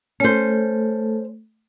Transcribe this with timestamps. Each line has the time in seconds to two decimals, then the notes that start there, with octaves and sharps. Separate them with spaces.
0.20 A3 C#4 A4 C5